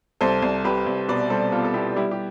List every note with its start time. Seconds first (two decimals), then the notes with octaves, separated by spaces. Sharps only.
0.21 C2 A4 C5
0.42 C2
0.64 C2 G4 B4
0.86 C2
1.08 B2 B4 D5
1.30 G3 A4 C5
1.52 B3 F4 A4
1.64 A4
1.74 B3 E4 G4
1.96 G3 E4 G4
2.11 G4